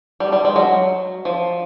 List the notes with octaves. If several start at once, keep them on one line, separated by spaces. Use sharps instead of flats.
G3
G3
G#3
F#3
F3